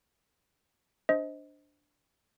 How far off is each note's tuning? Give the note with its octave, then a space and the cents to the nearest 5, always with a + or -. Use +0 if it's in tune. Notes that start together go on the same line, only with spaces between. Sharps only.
D4 +0 C5 +0 D#5 +25